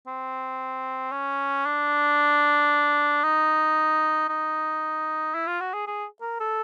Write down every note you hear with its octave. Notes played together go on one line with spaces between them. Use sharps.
C4
C#4
D4
D#4
D#4
E4
F4
F#4
G#4
G#4
A#4
A4